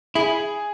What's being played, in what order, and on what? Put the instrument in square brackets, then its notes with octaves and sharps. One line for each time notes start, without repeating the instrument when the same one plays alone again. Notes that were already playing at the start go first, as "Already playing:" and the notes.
[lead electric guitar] E4 [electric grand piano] G#4